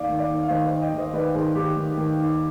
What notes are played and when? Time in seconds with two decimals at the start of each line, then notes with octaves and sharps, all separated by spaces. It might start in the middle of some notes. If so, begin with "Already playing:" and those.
Already playing: D#2 D5 F5
0.09 D#3
0.19 D5 F5
0.30 D#2
0.43 F5
0.50 D#3 C5 D#5
0.66 C5 D#5
0.71 D#2
0.82 D#5 G5
0.93 D#3
0.98 C5 D#5
1.13 D#3 B4 D5
1.34 D#3 G#4 C5
1.55 D#3 G4
1.76 D#3
1.97 D#3
2.19 D#2